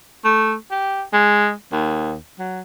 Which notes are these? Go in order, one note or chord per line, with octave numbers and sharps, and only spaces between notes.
A3
G4
G#3
D#2
F#3